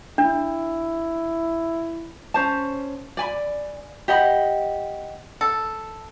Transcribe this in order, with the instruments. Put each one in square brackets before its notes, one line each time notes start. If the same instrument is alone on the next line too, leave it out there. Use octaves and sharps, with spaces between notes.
[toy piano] D4 [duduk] E4
[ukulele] C#4 C5 A5
D5 G#5 B5
G4 D#5 F#5 B5
[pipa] A4